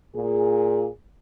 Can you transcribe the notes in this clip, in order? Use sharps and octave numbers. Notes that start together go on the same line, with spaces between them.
A#2 G#4